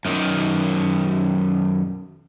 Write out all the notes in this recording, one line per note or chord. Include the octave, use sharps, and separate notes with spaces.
F#2 D#3